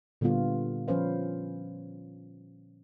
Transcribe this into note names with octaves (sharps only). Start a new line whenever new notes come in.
A#2 D3 G3 B3 F4
F3 C#4 B4 C5 F5